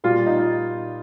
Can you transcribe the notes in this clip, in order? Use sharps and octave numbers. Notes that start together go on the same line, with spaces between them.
A#2 G3 F4
D#4